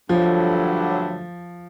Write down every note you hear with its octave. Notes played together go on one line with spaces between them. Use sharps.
G2 D3 F3 F#3 A3